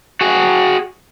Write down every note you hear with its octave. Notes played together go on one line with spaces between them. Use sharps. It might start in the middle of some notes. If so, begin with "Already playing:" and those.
F#4 G#4